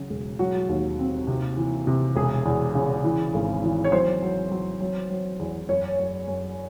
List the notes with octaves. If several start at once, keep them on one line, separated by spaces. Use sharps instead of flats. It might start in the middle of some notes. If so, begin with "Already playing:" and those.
Already playing: C#3 F#3
E1
F#3 F#4
D#2
C4
C3
E3
C3
E1 G#4
E2
C#3
E3
G#1
E3
C#5
F#3 C5
F#3
F#3
F#3
F#3
E2
F#2 C#5
F#2
F#2